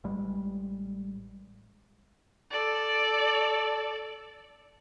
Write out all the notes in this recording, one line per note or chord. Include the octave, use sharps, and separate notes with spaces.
A1 G3 G#3
A4 D5